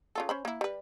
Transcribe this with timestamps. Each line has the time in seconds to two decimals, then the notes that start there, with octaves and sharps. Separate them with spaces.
0.15 C#3 F4 A4
0.29 C#4 C5 B5
0.45 A#3 E4
0.61 G3 B4